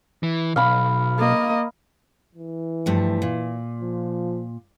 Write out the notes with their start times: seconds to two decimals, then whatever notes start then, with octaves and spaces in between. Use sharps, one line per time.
0.23 E3
0.56 B1 F5 B5
1.18 A#3 D#5
2.35 E3
2.86 G2 F3 A3
3.22 A#2
3.81 F3